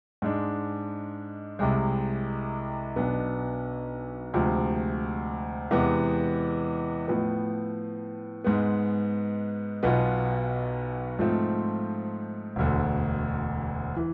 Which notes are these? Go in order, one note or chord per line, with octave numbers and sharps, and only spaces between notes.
G#2 G#3 D4
C2 C3 G#3
B1 B2 B3 D4
D2 C3 F3 G#3
E2 C3 E3 G#3 B3
A2 F3 B3
G#2 G#3 B3
B1 B2 B3 F4
G#2 F3 A3 C4 F4
E1 D2 D3
E3